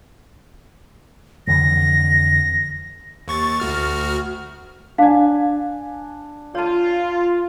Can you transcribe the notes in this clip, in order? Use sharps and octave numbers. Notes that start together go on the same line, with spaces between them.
F2 D3 E3 A#6
D#2 C#6 A6
D2 F#4 F6
D4 F5 G#5
F4 C#5 A5